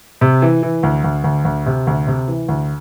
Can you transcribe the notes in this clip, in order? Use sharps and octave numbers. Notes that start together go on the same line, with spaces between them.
C3
E3
E3
D2
D2
D2
D2
C3
D2
C3
E3
D2